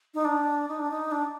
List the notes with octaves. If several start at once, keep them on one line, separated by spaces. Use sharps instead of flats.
D#4
D4
D#4
D4
D#4
D4